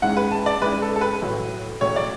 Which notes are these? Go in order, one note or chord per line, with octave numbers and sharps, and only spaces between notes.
G#2 G#3 C#4 E4 F#5
B4
A5
D5
G#2 G#3 C#4 E4 B4
A4
A4
B4
A1 A2 F#3
A1 A2 F#3 C#5
D5